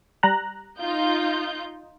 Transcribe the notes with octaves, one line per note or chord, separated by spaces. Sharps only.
G3 A#5 F#6
D#4 F4 G6